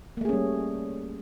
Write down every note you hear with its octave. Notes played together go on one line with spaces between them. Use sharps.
G3 A3 A#3 C#4 G#4